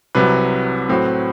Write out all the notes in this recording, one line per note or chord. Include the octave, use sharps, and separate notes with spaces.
C2 C3 F#3 B4
A2 F#3 C4